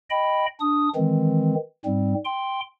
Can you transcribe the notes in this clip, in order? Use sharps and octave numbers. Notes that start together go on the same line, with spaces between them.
D#5 G5 B5
D4 D#6
D#3 E3 G#3 C4
G#2 G3 C4
G5 C6